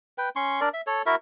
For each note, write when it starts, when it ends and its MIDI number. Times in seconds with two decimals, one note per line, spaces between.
0.18 0.29 71
0.18 0.29 79
0.36 0.60 61
0.36 0.60 84
0.36 0.60 85
0.61 0.69 62
0.61 0.69 70
0.61 0.69 74
0.73 0.81 76
0.87 1.02 69
0.87 1.02 73
1.06 1.15 64
1.06 1.15 66
1.06 1.15 70
1.06 1.15 76